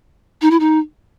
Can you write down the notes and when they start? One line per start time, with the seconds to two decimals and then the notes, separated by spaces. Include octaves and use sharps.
0.42 D#4
0.51 E4
0.60 D#4